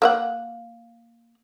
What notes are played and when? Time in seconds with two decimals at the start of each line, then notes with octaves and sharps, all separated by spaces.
0.02 A#3 E5 F#5